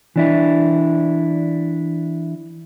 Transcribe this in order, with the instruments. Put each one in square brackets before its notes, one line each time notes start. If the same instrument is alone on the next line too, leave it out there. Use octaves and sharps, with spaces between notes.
[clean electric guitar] E3 D4 E4